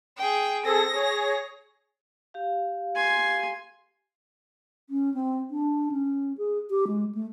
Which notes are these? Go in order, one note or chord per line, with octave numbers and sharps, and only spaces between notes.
G#4 G5
C4 G#4 A4 A#6
G#4 C#5
G4 F5
G#5 C6
C#4
C4
D4
C#4
G#4
G4
G#3
A3